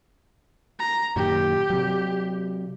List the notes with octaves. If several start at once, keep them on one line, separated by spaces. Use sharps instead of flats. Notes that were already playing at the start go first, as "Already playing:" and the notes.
A#5
F#2 A#2 D#3 G4
C3 F#3